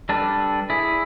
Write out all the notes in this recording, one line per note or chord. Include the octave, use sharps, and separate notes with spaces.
G3 D4 A4 B4
E4 G#4